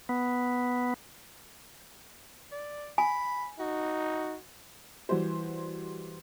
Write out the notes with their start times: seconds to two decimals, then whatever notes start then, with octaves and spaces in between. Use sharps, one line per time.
0.09 B3
2.52 D5
2.98 G#5 B5
3.60 D#4 F#4
5.09 E3 G3 F#4 C5